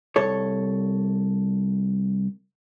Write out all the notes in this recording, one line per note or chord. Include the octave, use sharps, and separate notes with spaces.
C2 A4 C#5